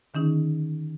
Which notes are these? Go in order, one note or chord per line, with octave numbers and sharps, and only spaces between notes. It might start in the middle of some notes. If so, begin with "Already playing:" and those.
D3 D#3 C#4 D#4 G#4